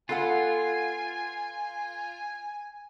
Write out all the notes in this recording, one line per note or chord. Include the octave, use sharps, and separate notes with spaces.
B3 F4 A4 F#5 G#5